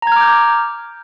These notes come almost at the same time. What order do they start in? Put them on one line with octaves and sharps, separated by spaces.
A#5 G#6 F6 D6 G6